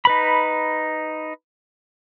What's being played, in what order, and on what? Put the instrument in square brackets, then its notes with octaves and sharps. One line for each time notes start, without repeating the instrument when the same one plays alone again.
[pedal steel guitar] D#4 B4 B5